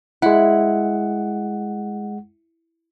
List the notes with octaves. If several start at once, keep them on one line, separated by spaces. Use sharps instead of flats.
G#3 E4 F#5